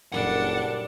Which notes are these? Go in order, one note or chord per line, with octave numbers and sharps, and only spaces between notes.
F#1 A#2 G3 D4 A4 F#5 A5 C6